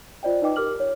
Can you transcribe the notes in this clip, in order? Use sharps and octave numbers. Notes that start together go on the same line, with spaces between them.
F4 C5 D5 D#5 G5
D#4 B4 D#5 G5 D6
G4 A#4 D6 F6 F#7
C#5